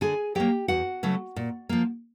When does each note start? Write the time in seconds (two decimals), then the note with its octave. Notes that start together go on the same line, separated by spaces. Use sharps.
0.01 D3 G#4 G#5
0.35 F#3 A#3 G4 G5
0.68 E2 F#4 F#5
1.03 C#3 F#3 A3
1.36 A#2
1.69 F3 A#3